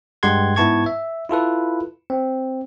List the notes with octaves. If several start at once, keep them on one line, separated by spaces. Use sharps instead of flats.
G2 G#3 G4 F#5 C6 G#6
G#2 B3 E4 A5 C#6 G#6
E5
E4 F4 A4 B4
C4